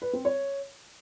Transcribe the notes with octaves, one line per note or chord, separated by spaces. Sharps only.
B4
C4
C#5